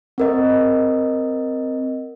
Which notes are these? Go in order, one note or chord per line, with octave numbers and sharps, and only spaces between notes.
C4 A#4 D#5